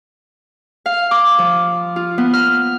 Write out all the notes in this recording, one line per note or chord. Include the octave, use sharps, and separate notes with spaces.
F5
D6
F3
F4
B3
F6